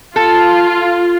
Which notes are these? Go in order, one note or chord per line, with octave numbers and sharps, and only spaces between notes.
F4 A4